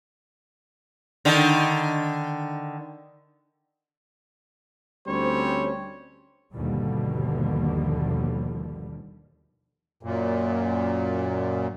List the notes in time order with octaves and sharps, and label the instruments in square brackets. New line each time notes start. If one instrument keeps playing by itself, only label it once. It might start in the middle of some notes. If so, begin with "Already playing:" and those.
[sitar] D3 D#3
[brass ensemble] D2 G3 C4 C#4 C5 C#5
[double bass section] G1 D#2 B2 D3 F3 G3
[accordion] F#2 A#2